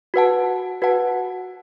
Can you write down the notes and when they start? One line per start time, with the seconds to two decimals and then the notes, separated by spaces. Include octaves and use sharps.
0.14 F#4 B4 F#5 A5
0.82 F#4 B4 F#5 A5